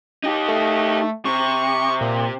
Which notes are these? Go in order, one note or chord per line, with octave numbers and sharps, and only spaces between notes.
D#4 G4
A3
C3 C#6
A#2